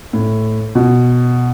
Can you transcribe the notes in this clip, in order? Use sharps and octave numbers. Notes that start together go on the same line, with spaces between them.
A2
B2